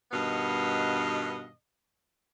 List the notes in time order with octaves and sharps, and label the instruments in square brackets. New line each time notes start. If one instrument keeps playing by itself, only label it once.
[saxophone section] G2 B2 D#3 B3 D#5 F5